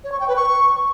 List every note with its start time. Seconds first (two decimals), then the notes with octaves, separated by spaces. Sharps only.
0.04 C#5
0.12 C#6
0.20 G5
0.28 B4
0.36 C#6